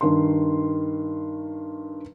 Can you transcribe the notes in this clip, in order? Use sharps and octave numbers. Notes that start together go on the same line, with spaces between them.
G2 D#3 C6